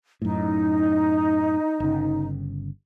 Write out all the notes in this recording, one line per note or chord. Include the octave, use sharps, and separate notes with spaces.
F#2 A2 D#4
G1 C#3